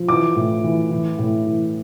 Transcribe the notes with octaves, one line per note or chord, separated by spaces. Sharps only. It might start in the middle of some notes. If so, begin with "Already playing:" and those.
Already playing: F3
E3 D6
A2
E3
E3
A2
E3